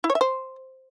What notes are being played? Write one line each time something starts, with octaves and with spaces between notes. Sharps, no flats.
E4
C#5
E5
C5